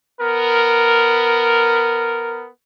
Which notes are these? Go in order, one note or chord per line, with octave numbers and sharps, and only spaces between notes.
B3 A#4